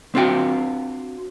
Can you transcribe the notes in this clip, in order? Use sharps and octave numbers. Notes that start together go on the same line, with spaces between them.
C4 D4 F4 F#4 G5